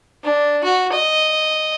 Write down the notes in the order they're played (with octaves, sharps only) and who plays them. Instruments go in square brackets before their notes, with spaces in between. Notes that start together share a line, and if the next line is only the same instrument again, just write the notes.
[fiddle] D4
F#4
D#5